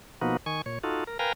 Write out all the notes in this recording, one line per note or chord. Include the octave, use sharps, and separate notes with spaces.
B2 F3 A#3 B3 D#4 F#4
D#3 G#5 C#6
A#2 C#5
D#4 F4 F#4 A4
A#4
A#4 B4 F5 G5 G#5 A#5